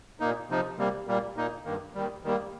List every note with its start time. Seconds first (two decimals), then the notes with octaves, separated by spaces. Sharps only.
0.20 A#2 A#3 D#4
0.49 C3 F3 D#4
0.78 C3 G3 A#3
1.07 A#2 G3 A#3
1.37 A#2 A#3 D#4
1.65 G2 D#3 A#3
1.94 D#2 D#3 G3
2.23 D#2 D#3 G3 A#3